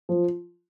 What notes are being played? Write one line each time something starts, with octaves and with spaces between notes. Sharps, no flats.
F3